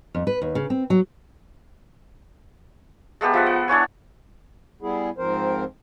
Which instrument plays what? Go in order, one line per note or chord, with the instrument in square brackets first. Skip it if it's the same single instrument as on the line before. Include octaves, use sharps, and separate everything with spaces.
[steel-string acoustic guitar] F2
B4
D#2
C#3
C4
F#3
[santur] G#3 A3 B3 G4
F3 E5 F#5
F#5
D4 E4 C#5 G#5
[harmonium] G3 B3 E4 G#4
G#2 F3 C4 A#4 C5